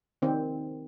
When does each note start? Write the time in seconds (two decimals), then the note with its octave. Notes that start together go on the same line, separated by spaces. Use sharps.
0.22 D#3 C4